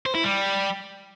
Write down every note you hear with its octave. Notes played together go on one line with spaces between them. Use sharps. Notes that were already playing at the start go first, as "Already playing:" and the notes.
C5
E4
G3